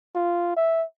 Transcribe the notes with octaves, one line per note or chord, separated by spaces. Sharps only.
F4
E5